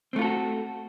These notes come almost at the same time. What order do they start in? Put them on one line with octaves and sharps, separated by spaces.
C4 A3 F4 A4 F#4